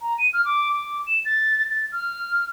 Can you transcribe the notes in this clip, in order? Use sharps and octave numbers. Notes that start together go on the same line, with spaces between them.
A#5
D#7
F6
D6
D6
E7
A6
A6
F6